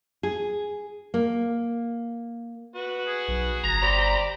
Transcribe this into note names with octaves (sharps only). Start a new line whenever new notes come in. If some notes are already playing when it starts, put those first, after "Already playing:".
G#4
A#3
F#4 B4
G#4
B1
G1 A#5
G4 C5 D5 B5